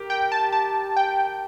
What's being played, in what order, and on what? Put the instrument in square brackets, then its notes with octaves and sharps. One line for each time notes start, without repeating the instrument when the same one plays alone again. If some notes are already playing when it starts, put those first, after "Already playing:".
Already playing: [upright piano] G4 A#4
[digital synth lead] G5
A5
A5
G5